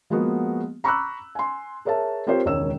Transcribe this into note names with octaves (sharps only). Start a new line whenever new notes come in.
F3 G#3 A#3 B3 F#4
A#5 B5 C#6 D6 E6 F#6
G#5 C6
G#4 A#4 C#5 E5 A5
C4 F4 G4 A#4 C5 C#5
E1 C#2 D#3 C#5 E6 E7